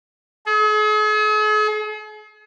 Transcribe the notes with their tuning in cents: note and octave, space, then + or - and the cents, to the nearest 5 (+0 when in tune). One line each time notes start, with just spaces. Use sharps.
G#4 +45